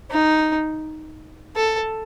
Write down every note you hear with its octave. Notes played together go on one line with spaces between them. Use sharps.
D#4
A4